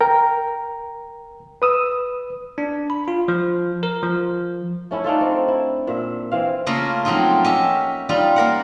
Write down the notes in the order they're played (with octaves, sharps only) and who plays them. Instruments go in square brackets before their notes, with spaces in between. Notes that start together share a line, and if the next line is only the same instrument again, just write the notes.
[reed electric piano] A#4 G5 A#5
B4 D#6 E6
[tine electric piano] D4
B5
F4
F3
A#4
F3
[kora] A3 C#4 E4
D4 D#4 F4 A4
C4
E4
A#2 E5
E3 C4 F5
[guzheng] C#3 A3 A#3 F4
F3 F#3 C4 D#4 F4
C#4 G4 E5 A#5
G3 D#4 F4
A#3 A#4 F#5